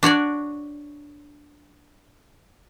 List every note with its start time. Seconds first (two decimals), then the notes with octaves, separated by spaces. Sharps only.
0.03 D4 F#4 C#5 D5